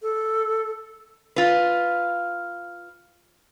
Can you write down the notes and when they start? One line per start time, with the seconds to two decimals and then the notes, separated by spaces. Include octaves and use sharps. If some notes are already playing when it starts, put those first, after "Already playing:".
0.02 A4
1.36 F4 B4